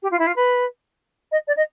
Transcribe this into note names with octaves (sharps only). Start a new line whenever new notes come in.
G4
F4
E4
F4
B4
D#5
D5
D#5